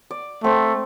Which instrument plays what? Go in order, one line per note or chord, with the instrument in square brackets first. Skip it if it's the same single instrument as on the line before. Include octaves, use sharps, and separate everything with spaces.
[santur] D5
[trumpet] A3 [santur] C4